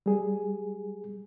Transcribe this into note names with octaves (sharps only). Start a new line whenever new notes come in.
G3 G#4